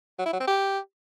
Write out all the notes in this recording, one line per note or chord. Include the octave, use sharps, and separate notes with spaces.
F#3
E4
F#3
C4
G4